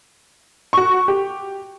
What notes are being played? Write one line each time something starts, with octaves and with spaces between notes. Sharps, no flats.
F#4 C#6
G4